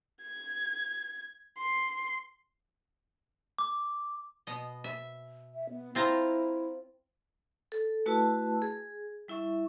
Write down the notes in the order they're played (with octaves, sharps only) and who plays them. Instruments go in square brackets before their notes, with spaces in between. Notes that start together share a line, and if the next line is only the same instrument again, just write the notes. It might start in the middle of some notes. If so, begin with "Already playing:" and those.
[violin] G#6
C6
[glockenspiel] D6
[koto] B2 D#5
E5
[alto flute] E5
B3
[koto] C4 F4 A#5 [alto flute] E4
[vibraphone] A4
A3 E4 F#4 B4 A5 E6
G#4
G3 E4 E5 C#6